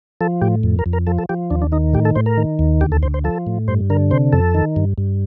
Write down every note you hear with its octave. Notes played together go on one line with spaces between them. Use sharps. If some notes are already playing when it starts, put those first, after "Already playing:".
F3 A4
A2 G4
F2
A#4
F2
A#4
F3 A4
A4
F3 G4
D#2 D4
D4
D#3 D#4
A2 G4
A4
A2 C5
A#4
D#3
D#2
D2 G4
A4
D2 C5
C5
F3 A4
A2
G2 C5
D3 A#4
C3 C5
F2 A4
D#3
G2
G2